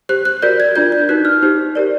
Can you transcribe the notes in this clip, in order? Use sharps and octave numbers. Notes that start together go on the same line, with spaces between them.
G4 C5 F#6
F#6
F#4 A#4 D5 G6
G#6
D4 F4 A#4 D5 G6
G6
D#4 F#4 B4 F#6
F6
D#4 G4 C5
G4 A#4 D5